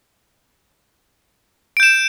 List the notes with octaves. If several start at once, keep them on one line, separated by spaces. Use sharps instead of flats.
G6 D7 E7